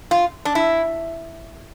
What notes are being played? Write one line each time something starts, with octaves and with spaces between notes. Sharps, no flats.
F4
D4
E4